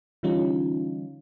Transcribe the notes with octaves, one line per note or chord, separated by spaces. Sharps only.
D3 E3 G3 C#4 D#4 F4